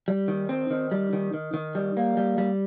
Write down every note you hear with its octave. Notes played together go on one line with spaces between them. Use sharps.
G3
D#3
C4
D#3
G3
D#3
D#3
D#3
G3
A#3
G3
G3